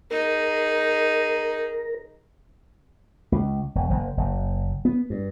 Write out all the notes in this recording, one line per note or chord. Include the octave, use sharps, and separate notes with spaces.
D#4 G#4 A#4
C#2
E1
F#1
F#1
B3
G2